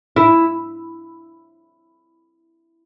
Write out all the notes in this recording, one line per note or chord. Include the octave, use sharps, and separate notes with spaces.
E4